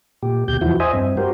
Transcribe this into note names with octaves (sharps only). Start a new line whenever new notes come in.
A#2 G4
D2 B2 G4 G6
E2 E3 F3 E4 F#4
C5 D#5 E5 G#5
G2 C4
F#4 G4 A#4 C5